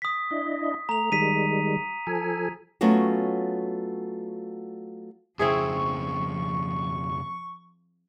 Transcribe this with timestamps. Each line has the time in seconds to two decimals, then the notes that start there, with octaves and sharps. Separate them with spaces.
0.02 D#6 B6
0.31 D4 E4 D#5
0.89 A3 A#5 F7
1.12 D#3 G3 G#3 B6 D#7
2.07 F3 A4 G#5
2.81 F#3 A3 B3 C#4 F4 F#4
5.39 F2 C#3 F3 C4 E4 G#4 C#6